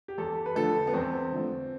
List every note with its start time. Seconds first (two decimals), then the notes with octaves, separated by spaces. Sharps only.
0.08 G4
0.18 E2 A4
0.46 B4
0.55 D3 F3 A3 A4
0.87 B3
0.93 E2 C4
1.32 D3 F3 A3